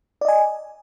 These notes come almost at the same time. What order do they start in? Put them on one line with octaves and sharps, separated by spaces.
D5 D#5 G#5